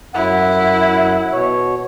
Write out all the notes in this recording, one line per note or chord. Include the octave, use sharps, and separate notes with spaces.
F#2 E4 F#5
B2 C#5